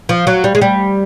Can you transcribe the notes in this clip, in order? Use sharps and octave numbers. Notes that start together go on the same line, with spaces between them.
F3
F#3
G3
G#3
G3